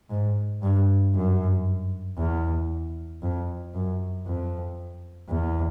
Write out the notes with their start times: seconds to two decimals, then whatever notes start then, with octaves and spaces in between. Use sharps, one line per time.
0.10 G#2
0.62 G2
1.14 F#2
2.18 E2
3.22 F2
3.74 F#2
4.26 F2
5.29 E2